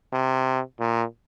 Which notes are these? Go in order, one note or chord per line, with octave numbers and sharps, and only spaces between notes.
C3
A#2